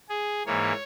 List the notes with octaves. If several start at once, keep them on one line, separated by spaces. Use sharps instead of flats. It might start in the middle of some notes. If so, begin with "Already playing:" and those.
G#4
G#2 E3 A#3 C#5